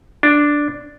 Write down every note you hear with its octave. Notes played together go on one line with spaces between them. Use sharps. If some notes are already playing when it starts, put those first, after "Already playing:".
D4